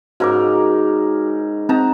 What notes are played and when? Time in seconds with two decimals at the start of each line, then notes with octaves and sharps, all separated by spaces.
0.20 G#2 C#3 F#4 A#4 D6
1.69 C4 D#4 A5 A#5